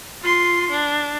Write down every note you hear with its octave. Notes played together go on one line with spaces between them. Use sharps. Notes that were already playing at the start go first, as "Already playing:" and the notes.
F4 C6
D4